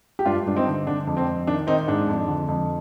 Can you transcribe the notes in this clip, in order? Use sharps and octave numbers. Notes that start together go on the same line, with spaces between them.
G4
G2 D4 F4
G2 D4
C4 D#4
D3
D3 D4
F2
C4
F2
D#3 D4
D#3 C4 D#4
G#2 D4
F2
D3
F2